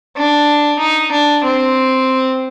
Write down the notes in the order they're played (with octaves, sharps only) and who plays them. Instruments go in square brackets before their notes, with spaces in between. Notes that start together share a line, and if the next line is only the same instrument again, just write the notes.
[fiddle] D4
D#4
D4
C4